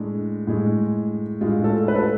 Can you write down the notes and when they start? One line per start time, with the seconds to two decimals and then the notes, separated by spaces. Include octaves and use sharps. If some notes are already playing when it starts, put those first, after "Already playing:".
Already playing: A2 G#3 D4
0.47 A2 G#3
1.41 A2 G#3 F4
1.64 A4
1.88 B4
1.96 A4